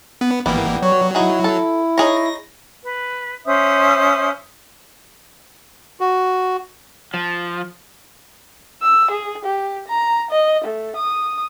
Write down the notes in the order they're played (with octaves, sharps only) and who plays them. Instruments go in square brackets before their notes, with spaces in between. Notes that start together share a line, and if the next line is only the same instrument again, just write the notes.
[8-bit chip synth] B3
[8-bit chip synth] G#1 E3 A#3 [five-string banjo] G3 B3
[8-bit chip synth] F#3 [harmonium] C#5
[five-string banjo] D#4 F#4 G#4 [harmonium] E4
[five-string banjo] A4
[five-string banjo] D#4 G#4 C#5 [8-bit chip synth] A#6
[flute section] B4
C#4 C5 E5 D#6
[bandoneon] F#4
[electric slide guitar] F3
[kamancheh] E6
G#4
G4
A#5
D#5
A3
D#6